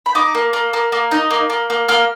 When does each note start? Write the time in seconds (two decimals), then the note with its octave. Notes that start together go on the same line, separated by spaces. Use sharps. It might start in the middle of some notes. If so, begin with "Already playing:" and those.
0.06 B5
0.15 D#4 D6
0.35 A#3
0.53 A#3
0.73 A#3
0.92 A#3
1.11 D#4
1.31 A#3
1.50 A#3
1.70 A#3
1.88 A#3 F6